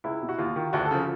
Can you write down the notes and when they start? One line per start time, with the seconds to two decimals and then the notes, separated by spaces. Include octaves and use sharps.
0.04 C#2 E4
0.22 B2
0.29 F#4
0.38 D#2 F4
0.56 D#3
0.73 D2 F#4
0.85 A4
0.91 C#3 F3